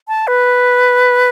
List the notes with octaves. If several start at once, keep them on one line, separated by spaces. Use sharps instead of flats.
A5
B4